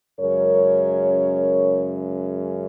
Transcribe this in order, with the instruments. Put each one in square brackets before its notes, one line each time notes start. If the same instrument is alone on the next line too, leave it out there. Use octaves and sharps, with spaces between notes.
[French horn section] F#2 C#3 G#3 A#4 C#5